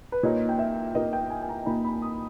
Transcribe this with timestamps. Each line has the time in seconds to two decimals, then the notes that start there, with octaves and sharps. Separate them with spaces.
0.12 B4
0.23 A#2 A#3 D#4 C#5
0.49 G5
0.59 E5
0.95 A#2 A#3 D#4 D#5
1.13 G5
1.30 G#5
1.41 G#5
1.49 A#5
1.66 A#2 A#3 D#4 B5
1.84 B5
2.02 D#6